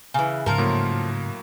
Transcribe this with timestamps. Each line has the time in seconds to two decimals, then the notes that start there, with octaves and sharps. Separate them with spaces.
0.14 C#3 E3
0.46 G#2 C#3 F3 A#4
0.58 A2 F#3 A#3